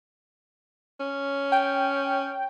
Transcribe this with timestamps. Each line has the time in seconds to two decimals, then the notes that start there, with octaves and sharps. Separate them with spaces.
1.00 C#4
1.52 G5